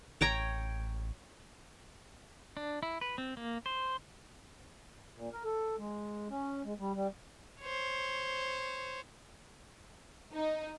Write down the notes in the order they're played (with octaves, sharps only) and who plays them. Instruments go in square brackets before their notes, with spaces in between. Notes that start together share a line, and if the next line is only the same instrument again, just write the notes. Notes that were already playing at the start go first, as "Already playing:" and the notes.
[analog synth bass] A1 [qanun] C#5 G5 A#5
[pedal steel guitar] D4
E4
B4
C4
A#3
C5
[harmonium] A#2
A#4
A4
G#3
C#4
G#3
G3
G3
[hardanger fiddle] C5 C#5
[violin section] D#4